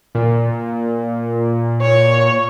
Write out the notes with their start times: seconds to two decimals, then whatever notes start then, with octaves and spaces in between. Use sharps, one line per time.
0.15 A#2
1.81 C#5